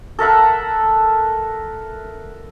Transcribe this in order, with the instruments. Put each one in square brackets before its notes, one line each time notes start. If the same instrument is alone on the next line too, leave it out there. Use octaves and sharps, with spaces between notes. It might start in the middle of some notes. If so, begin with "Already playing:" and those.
[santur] A4 A#4 E5 F#5